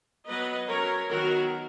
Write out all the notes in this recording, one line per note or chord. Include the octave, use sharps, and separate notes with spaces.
F#3 B3 B4 D#5
F#3 C#4 A#4 C#5
D#3 F#3 B3 F#4 A#4